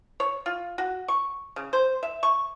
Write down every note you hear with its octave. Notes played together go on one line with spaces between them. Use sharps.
C#5
F4
F#4
C#6
C#3
C5
E5
C#6